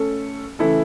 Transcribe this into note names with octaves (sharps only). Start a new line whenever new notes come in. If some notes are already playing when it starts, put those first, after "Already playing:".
Already playing: A3 C#4 A4
C#3 E3 A3 E4 A4